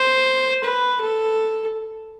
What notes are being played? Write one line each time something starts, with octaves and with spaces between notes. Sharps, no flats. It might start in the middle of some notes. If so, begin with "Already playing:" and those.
Already playing: C5
B4
A4